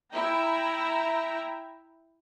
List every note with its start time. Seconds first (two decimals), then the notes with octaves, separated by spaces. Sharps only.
0.13 E4 E5 G5 A#5